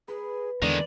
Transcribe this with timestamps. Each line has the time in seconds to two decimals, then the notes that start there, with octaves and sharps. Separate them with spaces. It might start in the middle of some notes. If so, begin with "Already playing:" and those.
0.08 G#4 B4
0.62 E2 D3 D#3 G#3 D5